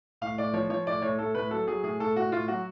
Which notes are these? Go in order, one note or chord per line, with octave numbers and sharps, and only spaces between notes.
A2 F5
A2 D5
F3 C#5
F3 C#5
A2 D5
A2 C#5
A2 A4
A2 B4
F#3 A4
F#3 G#4
A2 G#4
A2 A4
A2 F#4
A2 F4
F#3 F#4